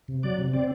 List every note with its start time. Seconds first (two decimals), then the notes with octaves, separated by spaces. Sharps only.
0.08 C3
0.23 F#3 D5
0.38 C3
0.53 C4 D5